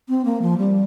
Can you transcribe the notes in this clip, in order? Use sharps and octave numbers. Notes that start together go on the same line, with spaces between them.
C4
A#3
F3
G3